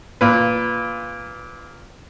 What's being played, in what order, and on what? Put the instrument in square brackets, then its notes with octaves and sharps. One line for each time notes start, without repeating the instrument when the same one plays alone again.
[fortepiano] A#2 B4